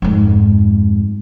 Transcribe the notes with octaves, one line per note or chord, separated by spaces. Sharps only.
F2 G#2